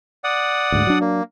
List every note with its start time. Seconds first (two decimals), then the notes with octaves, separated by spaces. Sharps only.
0.24 D5 F#5 D#6
0.72 D2 G#2
0.87 F#3 D4
1.01 A#3